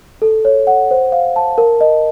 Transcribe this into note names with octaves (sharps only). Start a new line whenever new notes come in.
A4
C#5
F#5
C5
F5
A5
A#4
D#5